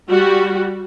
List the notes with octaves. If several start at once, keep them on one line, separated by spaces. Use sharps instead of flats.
G3 F#4